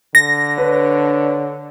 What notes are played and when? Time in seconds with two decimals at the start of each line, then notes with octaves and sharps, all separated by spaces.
0.15 D3 A#6
0.58 D4 B4 C#5